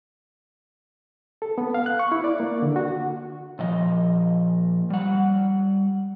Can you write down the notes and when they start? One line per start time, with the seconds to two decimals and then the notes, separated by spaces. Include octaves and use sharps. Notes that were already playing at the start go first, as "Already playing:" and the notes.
1.42 A4
1.58 B3
1.74 F5
1.86 F#6
1.99 C#6
2.12 E4
2.24 D5
2.40 A#3
2.62 D3
2.76 F#4
3.59 A#2 F3 D#5
4.90 G3 F#5